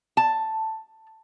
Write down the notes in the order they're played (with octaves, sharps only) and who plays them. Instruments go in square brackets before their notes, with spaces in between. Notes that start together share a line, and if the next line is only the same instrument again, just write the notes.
[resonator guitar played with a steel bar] A5